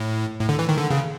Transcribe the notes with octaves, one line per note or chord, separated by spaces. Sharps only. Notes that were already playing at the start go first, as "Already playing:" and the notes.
Already playing: A2
A2
D3
E3
D#3
D3
C#3